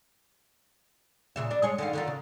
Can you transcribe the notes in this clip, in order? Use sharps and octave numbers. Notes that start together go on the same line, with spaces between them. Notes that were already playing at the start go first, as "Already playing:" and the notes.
A#2 C#3 E5
D4
G#3 G#4 C#5
D3 D#3 F5
D3 D#3 F4
C#3